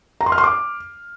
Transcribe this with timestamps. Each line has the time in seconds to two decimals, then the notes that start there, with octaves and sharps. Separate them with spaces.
0.21 A#5
0.26 C6
0.32 F6
0.38 C6
0.44 D6